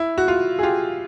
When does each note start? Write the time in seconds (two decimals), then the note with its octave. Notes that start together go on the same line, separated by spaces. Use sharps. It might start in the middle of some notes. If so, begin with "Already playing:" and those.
Already playing: E4
0.18 F#4
0.28 F4
0.59 G#4
0.63 F4 G4